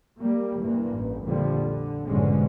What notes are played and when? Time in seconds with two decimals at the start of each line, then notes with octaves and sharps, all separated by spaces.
0.18 G3 A#3
0.58 F#1 G2 E3 A#3
0.90 A1
1.25 A#1 F2 D3 F3 G3
1.65 D3
2.07 F1 G#2 B2 D3 G#3 C#4